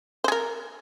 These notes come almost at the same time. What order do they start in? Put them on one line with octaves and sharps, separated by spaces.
C5 G#4 A#4